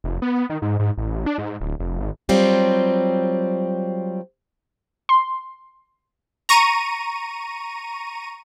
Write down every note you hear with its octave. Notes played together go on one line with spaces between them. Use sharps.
F1
B3
D#3
G#2
G#2
A1
D4
G#2
D1
F1
G#1
F#3 G3 C4 F4
C6
A#5 C#6 D#7